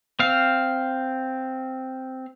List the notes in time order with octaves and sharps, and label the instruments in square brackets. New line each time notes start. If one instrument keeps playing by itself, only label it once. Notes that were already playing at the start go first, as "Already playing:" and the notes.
[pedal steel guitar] C4 F5